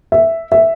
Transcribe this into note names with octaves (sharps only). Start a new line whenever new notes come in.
E5
E5